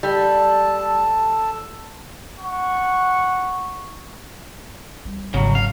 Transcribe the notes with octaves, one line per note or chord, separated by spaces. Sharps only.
G3 A4 A5
F#5 C#6
G3
G#1 C#3 F#3
F5